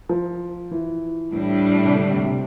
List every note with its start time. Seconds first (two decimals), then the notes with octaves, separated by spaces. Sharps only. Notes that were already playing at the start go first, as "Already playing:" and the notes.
0.09 F3
0.71 E3
1.33 A2 E3 G3 D4
1.85 C3
1.95 D3
2.10 C3
2.25 C3